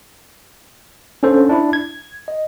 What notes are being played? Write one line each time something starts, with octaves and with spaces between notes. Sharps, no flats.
C#4 D4 A4 C5
D4 E4
G#6
D#5